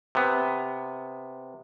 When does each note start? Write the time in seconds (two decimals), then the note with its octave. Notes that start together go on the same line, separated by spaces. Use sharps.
0.15 C3 B3